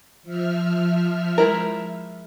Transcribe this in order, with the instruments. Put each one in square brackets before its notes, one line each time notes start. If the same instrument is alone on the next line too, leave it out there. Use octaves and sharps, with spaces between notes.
[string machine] F3 E5 F6
[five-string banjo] G#3 E4 A#4